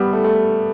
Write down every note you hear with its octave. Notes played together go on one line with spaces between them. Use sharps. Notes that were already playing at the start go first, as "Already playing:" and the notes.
Already playing: G3 B3
A3
A3